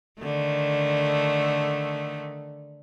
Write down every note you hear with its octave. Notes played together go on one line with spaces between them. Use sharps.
D3 D#3 A3